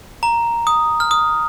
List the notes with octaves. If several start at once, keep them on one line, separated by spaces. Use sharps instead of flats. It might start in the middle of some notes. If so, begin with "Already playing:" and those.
A#5
D#6
F6
D#6